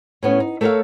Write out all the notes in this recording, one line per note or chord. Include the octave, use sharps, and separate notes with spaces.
A2 B3 C#4
D#4
A3 A4 A#4 C5 C#5 F5